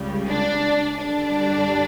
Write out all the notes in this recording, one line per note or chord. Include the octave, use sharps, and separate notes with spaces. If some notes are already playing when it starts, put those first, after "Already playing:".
Already playing: C#2 C#3 G3
D4
F#2 D3 G3 D4